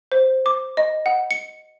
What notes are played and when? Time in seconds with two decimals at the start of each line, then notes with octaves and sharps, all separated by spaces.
0.12 C5
0.46 D6
0.77 D#5
1.06 F#5
1.31 C#7